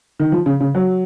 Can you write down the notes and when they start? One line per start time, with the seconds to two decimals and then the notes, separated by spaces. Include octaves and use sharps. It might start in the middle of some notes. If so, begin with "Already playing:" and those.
0.20 D#3
0.32 F3
0.46 C#3
0.60 C#3
0.75 F#3